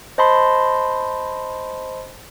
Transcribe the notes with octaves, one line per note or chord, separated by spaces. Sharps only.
C5 D#5 A5 B5 C6